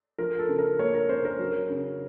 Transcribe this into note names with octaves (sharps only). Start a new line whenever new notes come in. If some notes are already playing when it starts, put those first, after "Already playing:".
F3 A#4
A4
C#3
A#4
A#3 C#5
A#4
C#4 C5
A#4
F#3
C#3